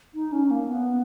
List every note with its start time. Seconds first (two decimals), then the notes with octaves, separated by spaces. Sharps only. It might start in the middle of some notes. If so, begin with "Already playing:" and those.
0.14 D#4
0.32 C#4
0.51 A#3
0.69 B3